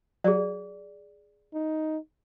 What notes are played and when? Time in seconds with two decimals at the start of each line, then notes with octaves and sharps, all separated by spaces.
0.24 F#3 G#4 D5
1.54 D#4